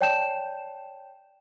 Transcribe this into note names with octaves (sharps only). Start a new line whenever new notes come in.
C#5 D5 G5 A5 G6 E7